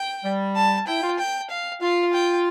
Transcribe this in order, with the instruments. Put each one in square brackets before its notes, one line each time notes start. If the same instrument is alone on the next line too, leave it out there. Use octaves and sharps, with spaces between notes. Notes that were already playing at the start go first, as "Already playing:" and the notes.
Already playing: [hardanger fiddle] G5
[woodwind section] G3
[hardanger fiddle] A5
[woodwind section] E4 [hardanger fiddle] G5
[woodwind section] F4
[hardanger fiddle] G5
F5
[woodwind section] F4 [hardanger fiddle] F5
[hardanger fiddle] G5